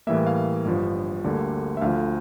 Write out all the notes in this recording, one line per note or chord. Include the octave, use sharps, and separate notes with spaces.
A2 E3 G3 A#3 E5
F5
G1 G2 F3
D2 D3 G3 A#3
E5
D2 D3 F3 F5